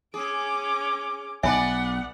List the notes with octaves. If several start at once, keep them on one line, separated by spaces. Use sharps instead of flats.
C#4 G#4 D6
B1 B3 B4 D5 E5 F#5 G#5 A5